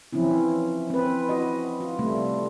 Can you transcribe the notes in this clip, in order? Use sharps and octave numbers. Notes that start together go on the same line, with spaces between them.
E3 F3 C4 C#4 E4
C4 B4
F#4 D#5
F4
C3 G3 A3